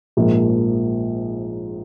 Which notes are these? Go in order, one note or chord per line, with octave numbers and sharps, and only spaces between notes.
A#1 G#2 F3 A#3